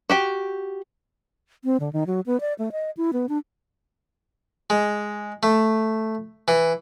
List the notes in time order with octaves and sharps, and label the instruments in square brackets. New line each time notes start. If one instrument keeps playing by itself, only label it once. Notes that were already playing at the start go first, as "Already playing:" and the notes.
[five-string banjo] F#4 G4 G5
[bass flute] C4
D3
D#3
F#3
B3
D5
A3
D#5
E4
B3
D4
[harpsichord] G#3
A3
E3